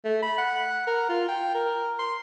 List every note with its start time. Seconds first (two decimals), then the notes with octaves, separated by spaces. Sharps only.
0.05 A3
0.22 B5
0.38 F#5
0.87 A#4
1.09 F4
1.28 G5
1.54 A#4
1.99 C6